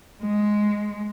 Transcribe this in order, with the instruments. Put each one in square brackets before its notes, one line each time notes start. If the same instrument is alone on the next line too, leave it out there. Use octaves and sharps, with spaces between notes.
[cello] G#3